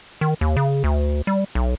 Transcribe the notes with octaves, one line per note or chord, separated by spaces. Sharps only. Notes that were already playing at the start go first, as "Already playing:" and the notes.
D#3
D#2
C#3
D2
G3
B1